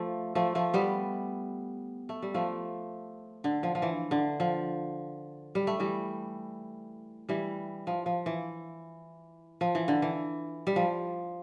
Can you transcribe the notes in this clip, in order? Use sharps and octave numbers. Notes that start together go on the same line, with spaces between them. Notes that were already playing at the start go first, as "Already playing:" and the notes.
Already playing: F3 A3
F3 A3
F3 A3
G3 B3
A3
G3
F3 A3
D3
F3
F3
E3
D3
F3
G3
A3
E3 G3
E3 G3
F3
F3
E3
F3
E3
D3
E3
G3
F3